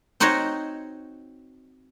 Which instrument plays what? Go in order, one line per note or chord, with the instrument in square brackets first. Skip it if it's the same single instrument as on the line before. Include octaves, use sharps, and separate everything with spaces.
[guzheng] C4 D#4 F#4 C5 C#5 D#5